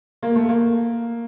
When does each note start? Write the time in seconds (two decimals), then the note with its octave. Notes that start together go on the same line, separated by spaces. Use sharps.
0.23 A#3
0.35 A3
0.49 A#3